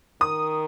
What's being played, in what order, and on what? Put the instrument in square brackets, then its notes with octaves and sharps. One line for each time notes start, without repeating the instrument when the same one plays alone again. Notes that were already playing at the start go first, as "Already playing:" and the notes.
[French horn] D#3 [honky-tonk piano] D#6